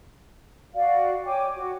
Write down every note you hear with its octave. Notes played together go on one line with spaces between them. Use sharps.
F#4 D5 F5
C#5 G5 G#5 D6
F#4